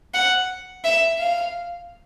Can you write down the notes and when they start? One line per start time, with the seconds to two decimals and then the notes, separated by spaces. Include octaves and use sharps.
0.14 F#5
0.84 E5
1.19 F5